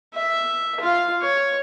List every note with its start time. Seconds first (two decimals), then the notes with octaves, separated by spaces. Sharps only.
0.15 E5
0.81 F4 F5
1.22 C#5